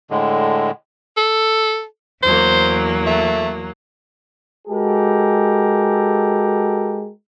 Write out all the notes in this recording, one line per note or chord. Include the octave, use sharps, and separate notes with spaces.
A2 D3 G#3
A4
E2 F#3 A#3 C5
A3
G#3 F#4 G4 A4 A#4